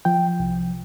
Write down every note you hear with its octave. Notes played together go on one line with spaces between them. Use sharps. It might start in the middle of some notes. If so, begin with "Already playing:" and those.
F3 G5
C2